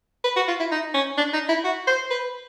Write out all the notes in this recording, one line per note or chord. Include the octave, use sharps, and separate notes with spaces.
B4
F#4
F4
E4
D#4
C#4
D4
D#4
E4
F#4
C5
B4